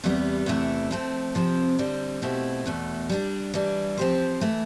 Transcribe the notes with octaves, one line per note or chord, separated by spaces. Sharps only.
E2 C3 G3 B3
E2 C3 E3 A3 E4
F3 A3 C4
C3 F3 C4
D3 G3 C4
B2 A3 C4 E4 G4
E2 B2 A3
G3 B3 D4
E3 G3 D4
F3 C4 G4 C5
E3 A3